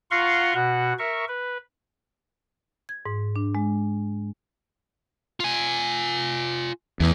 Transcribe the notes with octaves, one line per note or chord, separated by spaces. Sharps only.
F4 F5 F#5 A#5 C6 C#6
B2 F#4 F#5
A#4 E5 C#6
B4
G#6
G#2
D4
G#3
F4 G#5
E2 A2 E3